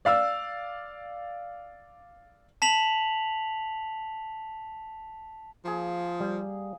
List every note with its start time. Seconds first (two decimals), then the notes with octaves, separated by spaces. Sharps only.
0.05 D5 F5 E6
2.62 A5 B6 F7 F#7
5.65 F3 A#3 G#4
6.20 G3